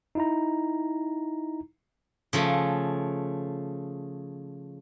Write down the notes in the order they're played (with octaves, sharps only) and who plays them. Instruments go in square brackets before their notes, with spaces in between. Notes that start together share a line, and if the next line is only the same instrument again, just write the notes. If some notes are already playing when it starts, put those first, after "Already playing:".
[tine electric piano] D#4 E4 A#5
[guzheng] C#3 F3 A3